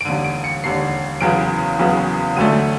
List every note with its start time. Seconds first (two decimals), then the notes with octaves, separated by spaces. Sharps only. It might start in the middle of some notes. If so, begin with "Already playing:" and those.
0.01 D7
0.05 E1 D#2 D3 D#7
0.24 D7
0.44 C#7
0.64 E1 D#2 D3 C7
1.20 F#1 E2 C#3 F#3 B3 D7
1.79 F#1 E2 C#3 F#3 B3
2.36 E1 D2 D3 F#3 A3 D#7